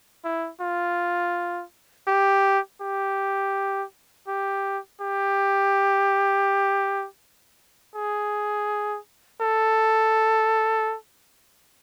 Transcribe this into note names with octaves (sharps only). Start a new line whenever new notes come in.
E4
F4
G4
G4
G4
G4
G#4
A4